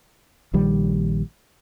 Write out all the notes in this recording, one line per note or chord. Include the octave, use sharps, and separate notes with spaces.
A#1 D#3 G3